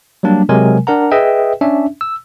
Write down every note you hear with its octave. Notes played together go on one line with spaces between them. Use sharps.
F#3 G3 A#3 D4
C3 F#3 G#3 A#4 G#5
D4 A#4 F#5 A#5
G#4 B4 D#5 E5 G5
C#4 D4 E5
E6